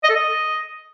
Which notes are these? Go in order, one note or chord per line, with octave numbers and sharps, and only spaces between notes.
D#5
A4
D#5